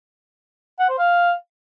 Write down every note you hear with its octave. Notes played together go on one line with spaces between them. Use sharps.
F#5
C5
F5